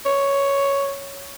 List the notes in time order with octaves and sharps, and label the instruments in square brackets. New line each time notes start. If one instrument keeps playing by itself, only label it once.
[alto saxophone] C#5